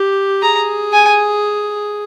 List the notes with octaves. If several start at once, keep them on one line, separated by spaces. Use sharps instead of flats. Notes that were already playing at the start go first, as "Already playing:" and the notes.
Already playing: G4
G#4 A#5
G#5